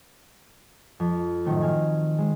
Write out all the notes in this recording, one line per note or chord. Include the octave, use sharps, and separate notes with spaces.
F2
F#2 A2 D#3 A3 C4
G#5 F6 G#6
G#3